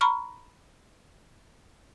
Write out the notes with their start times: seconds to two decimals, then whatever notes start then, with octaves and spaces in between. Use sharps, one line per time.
0.01 A#5 B5 C#6 F6